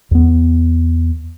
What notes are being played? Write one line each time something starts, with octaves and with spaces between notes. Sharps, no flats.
E2 B3